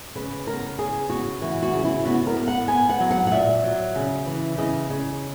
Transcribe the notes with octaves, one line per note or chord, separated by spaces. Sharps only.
C#3 B4
B3 A#4
C#3 G#4
B3 F#4
E3 F#4
F#4
C#3
E4
B3 F#4
A#4
B3
F#5
B3 G#5
F#5
F#3
F#5
F#5
A#2 E5
F#3
C#3
E3
C#3 D#5
C#3